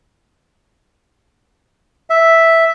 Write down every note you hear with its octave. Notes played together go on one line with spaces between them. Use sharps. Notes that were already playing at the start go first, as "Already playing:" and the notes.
E5